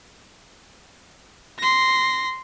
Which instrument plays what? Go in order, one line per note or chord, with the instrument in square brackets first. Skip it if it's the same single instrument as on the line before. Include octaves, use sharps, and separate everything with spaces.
[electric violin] C6 A#6